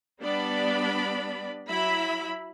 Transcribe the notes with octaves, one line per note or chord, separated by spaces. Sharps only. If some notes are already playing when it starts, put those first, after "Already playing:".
G3 B3 D4 D5 B5
F#3 E4 E5 B5